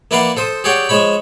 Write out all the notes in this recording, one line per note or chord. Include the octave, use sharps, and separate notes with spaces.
A#3 E4 B4 D5 F5 F#5
A4 C5 D#6
G4 G#4 C#5 D5 F#5 G5
F3 G#3 C#5 B5